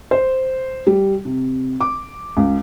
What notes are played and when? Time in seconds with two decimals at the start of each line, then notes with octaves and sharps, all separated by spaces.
0.11 C5
0.87 G3
1.25 C3
1.81 D6
2.37 C#2